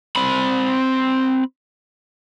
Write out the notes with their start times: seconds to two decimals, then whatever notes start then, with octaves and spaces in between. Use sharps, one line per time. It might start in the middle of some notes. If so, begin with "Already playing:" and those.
0.16 C4 B5